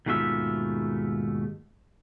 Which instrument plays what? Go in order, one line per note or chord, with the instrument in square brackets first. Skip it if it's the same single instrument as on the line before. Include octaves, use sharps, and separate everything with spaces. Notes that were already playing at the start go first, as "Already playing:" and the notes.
[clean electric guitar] D#2 G#2 B2 A3 F4 E5